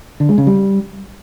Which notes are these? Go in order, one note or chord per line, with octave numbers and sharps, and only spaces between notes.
D3
G#3
C#3
G3